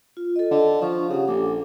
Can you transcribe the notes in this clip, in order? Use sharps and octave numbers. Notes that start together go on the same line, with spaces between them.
F4
A4 D#5
D3
F3 D4 C#6
C#3 C#4 G4 F#5
A#1 A4 D6